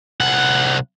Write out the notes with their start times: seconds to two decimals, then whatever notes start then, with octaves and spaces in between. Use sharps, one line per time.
0.21 C2 F#5